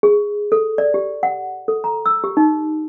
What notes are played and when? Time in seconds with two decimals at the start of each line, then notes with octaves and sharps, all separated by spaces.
0.03 G#4
0.52 A4
0.78 D5
0.94 G4
1.23 F#5
1.68 A4
1.84 A#5
2.06 E6
2.24 G4
2.37 D#4